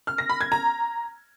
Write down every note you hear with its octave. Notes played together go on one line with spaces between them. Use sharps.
F6
A#6
B5
G#6
A#5